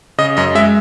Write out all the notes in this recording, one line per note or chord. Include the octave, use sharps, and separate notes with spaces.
C#3 D#5
F#2 D#5
G#3 E5